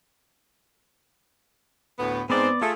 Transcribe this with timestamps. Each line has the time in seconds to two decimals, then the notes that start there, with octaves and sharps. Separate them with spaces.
1.99 D2 A2 B3
2.30 G#2 B3 C4 D5
2.62 A3 F4 G#4 A4